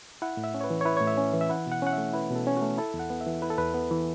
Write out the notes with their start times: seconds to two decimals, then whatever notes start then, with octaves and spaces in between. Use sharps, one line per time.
0.22 E4 F#5
0.37 A2
0.44 E5
0.54 C#4
0.61 C#5
0.64 B4
0.70 E3
0.81 C#5
0.86 E4 B4
0.97 A2 C#5
1.07 E5
1.17 C#4
1.33 E3
1.41 E5
1.49 E4 F#5
1.67 B2
1.72 F#5
1.82 C#4 F#5
1.93 E5
1.98 A3
2.13 E4 B4
2.31 B2 A4
2.47 C#4
2.57 A3 F#4
2.78 E4 A4
2.94 E2
2.99 F#5
3.10 B3
3.21 E5
3.27 E3
3.42 E4 B4
3.50 A4
3.58 E2 B4
3.74 B3
3.91 E3